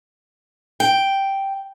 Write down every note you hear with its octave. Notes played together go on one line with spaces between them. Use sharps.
G5